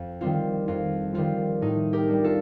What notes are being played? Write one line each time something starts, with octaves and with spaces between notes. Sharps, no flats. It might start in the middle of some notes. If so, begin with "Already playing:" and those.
Already playing: F2
D#3 G3 C4 F4
F2 F4
D#3 G3 C4 F4
A2 D#4
G4 A#4
G3 D4
F4 A4